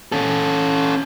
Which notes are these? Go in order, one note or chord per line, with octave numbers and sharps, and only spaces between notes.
C#4 A4